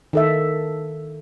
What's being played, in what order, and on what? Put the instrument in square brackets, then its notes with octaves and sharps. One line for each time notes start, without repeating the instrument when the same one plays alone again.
[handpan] D#3 A4 E5